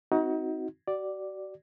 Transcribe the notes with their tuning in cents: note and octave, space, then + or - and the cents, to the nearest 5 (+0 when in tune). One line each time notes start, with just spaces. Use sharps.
C4 +0 D#4 +30 F#4 +10
F#4 +40 D5 +0